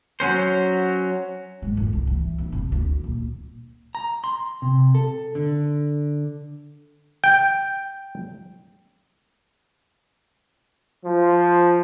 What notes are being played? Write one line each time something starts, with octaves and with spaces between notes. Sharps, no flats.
F#3 C#4 C5
G#2
F2
C2
E3
G1
C3
D2
A#2
A#5
C6
C3
A4
D3
G5
F3